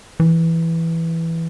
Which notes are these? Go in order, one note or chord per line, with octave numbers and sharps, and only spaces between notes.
E3